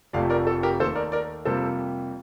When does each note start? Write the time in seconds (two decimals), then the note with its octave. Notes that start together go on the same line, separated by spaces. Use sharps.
0.13 F1 F2 C3 F3 A3 D5 F5
0.30 A#4 D5
0.47 A4
0.63 G4 A#4
0.80 D#2 D#3 A3 A4 C5
0.96 A#4 D5
1.12 A#4 D5
1.45 F2 C3 G3 A#3 A4 C5